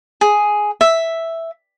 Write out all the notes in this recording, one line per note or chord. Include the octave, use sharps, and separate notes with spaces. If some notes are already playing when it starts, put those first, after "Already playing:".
G#4
E5